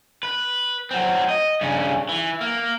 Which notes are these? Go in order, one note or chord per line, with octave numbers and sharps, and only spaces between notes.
B4
F#3 C4
D#5
G2 C#3
E3
A#3